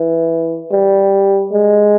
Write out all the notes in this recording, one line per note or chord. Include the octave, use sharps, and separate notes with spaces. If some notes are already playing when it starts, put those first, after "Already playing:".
Already playing: E3
G3
G#3